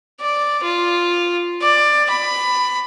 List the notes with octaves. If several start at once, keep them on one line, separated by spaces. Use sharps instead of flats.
D5
F4
D5
B5